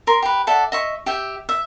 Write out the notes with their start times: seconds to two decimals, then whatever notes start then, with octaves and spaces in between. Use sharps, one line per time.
0.07 A#4 C6
0.22 G4 B4
0.47 A4 D5 E5 F#5
0.72 D#5 E5 C#6
1.06 G4 E5 G5
1.49 E5